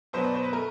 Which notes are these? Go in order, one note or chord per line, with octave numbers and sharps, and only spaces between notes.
B2 F#3 B3 C5
D5
C5
B4
A3 A#4